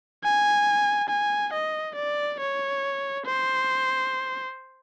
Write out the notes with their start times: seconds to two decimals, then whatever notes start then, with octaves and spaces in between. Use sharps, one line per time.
0.24 G#5
1.09 G#5
1.53 D#5
1.96 D5
2.40 C#5
3.26 C5